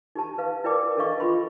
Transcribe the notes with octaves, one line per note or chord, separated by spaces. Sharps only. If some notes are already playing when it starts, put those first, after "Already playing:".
D#4 G4 A5
B4 F5
E4 A#4 B4 D5 G5 D6
D4 A4 B4 D#5 F5 C#6
F4 A4 B5 C6